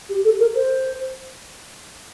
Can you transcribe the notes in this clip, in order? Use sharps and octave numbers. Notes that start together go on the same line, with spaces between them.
G4
A4
A#4
C5